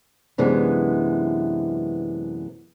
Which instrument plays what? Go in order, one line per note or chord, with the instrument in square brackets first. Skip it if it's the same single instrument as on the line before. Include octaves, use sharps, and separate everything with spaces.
[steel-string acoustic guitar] F#2 C3 E3 G#3 B3 D4